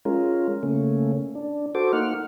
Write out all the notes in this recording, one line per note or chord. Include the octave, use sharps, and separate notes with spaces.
G#3 C#4 F4 A#4
C#3 A3 A#3 C#4
D4
F#4 A4 C5 D6
A#3 D#4 F#5 F6